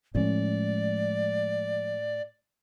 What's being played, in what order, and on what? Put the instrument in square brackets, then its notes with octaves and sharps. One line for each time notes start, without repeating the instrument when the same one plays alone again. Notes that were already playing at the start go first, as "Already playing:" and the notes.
[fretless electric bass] A2 C#4 [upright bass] F3 G#3 [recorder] D5